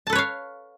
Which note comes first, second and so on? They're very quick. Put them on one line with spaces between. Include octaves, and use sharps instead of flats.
A5 A4 B4 C#5 F5